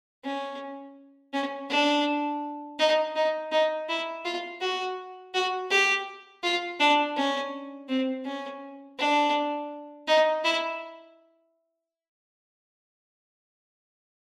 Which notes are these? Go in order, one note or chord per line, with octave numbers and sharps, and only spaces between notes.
C#4
C#4
D4
D#4
D#4
D#4
E4
F4
F#4
F#4
G4
F4
D4
C#4
C4
C#4
D4
D#4
E4